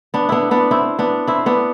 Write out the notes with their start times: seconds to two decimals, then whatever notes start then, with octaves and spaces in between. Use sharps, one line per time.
0.14 B3 D4
0.29 B3 D4 E4
0.51 B3 D4
0.71 C4 E4
0.99 B3 D4
1.27 C4 E4
1.46 B3 D4